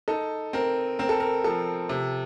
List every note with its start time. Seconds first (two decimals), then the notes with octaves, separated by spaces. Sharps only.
0.08 D#4 A4
0.53 C4 A#4
0.99 C4 A#4
1.09 A4
1.20 A#4
1.44 F3 A4
1.89 C3